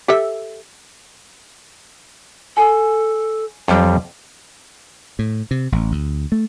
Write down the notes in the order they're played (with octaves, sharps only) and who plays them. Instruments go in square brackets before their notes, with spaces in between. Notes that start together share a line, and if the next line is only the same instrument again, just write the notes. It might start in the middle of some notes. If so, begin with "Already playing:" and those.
[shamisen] G4 A4 E5
[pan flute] A4 [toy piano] G#5
[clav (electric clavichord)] F2 G3 [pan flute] F#3
[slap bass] A2
C3
A1
D2
A3